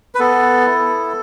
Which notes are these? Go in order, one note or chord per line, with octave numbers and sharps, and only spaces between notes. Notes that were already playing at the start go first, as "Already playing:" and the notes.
B4
B3 A4
E4